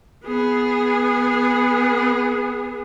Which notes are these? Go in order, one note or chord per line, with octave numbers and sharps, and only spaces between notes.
B3 G#4